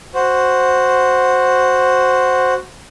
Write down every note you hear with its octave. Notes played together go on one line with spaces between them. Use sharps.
F#4 C5